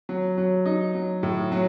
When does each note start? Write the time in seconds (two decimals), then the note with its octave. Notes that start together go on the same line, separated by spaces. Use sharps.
0.09 F#3
0.38 F#3
0.66 D#4
0.95 F#3
1.23 A2
1.52 F#3